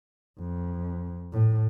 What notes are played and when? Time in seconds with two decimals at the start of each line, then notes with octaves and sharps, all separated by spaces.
0.39 F2
1.33 A2